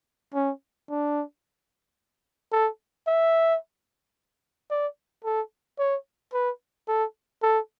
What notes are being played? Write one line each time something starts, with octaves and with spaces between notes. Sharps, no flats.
C#4
D4
A4
E5
D5
A4
C#5
B4
A4
A4